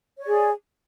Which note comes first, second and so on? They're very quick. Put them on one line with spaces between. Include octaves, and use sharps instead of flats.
C#5 D5 G#4